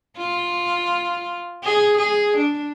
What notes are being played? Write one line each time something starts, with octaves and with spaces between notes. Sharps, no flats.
F4
G#4
G#4
D4